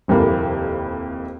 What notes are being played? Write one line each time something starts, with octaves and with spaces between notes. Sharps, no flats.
D#1 F2 C3 A#3 E4